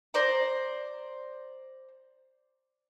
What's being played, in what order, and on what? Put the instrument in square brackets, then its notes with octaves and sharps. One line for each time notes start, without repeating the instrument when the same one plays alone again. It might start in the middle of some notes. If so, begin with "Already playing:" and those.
[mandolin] C5 D5 A#5